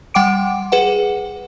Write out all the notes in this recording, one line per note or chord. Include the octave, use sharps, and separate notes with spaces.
G3 F#5 G5 D6 D7
G#4 B4 F#5